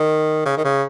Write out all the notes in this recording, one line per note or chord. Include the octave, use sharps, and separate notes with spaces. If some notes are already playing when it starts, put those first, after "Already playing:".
Already playing: D#3
C#3
D#3
C#3